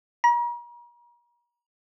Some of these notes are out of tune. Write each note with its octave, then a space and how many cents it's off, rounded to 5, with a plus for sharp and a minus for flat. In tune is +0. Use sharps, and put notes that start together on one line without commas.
A#5 +40